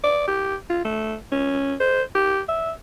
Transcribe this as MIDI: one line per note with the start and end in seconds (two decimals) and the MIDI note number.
0.04 0.26 74
0.28 0.55 67
0.70 0.80 65
0.84 1.14 57
1.32 1.74 61
1.80 2.02 72
2.15 2.40 67
2.48 2.72 76